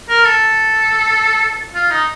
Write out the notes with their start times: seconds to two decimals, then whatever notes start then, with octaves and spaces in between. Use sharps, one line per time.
0.09 A#4
0.25 A4
1.74 F4
1.91 D#4